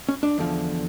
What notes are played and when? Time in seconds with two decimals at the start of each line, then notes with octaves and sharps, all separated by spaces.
0.09 C#4
0.23 D4
0.38 E2 D3 F3